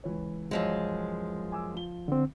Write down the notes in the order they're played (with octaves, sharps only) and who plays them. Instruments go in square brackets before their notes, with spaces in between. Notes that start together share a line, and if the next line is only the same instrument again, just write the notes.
[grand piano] C#2 E3 C#5
[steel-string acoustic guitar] F#2 F3 G#3
[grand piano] G#5 D6 E6
F3 G7
[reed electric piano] D3 C4